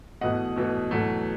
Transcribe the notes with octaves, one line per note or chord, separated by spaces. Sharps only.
E2 B2 A3 D#5 F#5
E2 B2 A3
E2 B2 F#3 A3